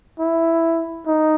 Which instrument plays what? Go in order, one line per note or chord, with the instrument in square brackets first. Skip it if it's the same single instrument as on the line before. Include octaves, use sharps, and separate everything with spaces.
[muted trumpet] E4
D#4